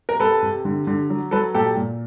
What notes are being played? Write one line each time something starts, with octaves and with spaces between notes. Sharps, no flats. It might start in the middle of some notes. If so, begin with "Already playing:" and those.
A#4
C3 A4 B4
C3
D3
D3
F#3
F#3 A4 B4
A#2 G4 A4
A#2